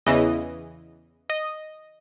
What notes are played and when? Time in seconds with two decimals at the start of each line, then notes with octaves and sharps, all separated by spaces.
0.06 E2 C#3 E3 D#5
1.30 D#5